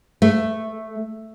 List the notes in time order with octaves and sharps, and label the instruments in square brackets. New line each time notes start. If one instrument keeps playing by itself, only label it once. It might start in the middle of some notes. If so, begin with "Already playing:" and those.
[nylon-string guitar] A3